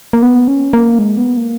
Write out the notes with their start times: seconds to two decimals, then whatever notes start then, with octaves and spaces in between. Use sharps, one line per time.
0.13 A#3
0.22 B3
0.48 C#4
0.73 A#3
0.99 G#3
1.17 B3
1.37 A#3